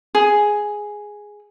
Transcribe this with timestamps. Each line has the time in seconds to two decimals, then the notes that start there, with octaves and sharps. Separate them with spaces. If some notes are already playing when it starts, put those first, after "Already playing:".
0.15 G#4